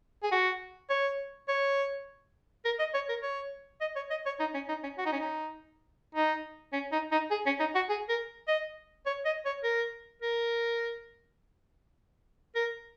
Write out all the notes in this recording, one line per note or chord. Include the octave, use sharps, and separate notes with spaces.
G#4
F#4
C#5
C#5
A#4
D#5
C#5
A#4
C#5
D#5
C#5
D#5
C#5
D#4
C#4
D#4
C#4
F#4
D#4
C#4
D#4
D#4
C#4
D#4
D#4
G#4
C#4
D#4
F#4
G#4
A#4
D#5
C#5
D#5
C#5
A#4
A#4
A#4